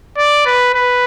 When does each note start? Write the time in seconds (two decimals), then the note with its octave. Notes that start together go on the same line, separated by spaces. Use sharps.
0.17 D5
0.46 B4
0.74 B4